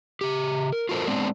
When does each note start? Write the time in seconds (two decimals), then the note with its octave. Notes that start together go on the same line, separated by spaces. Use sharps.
0.21 C#3 G4
0.72 A#4
0.89 F4 F#4 A4 A#4 C5
1.07 G#3 B3 C4 D4